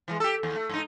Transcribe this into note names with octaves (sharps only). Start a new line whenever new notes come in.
E3 F3 G#3
G4 A4
D#2
A3
G#2 D#4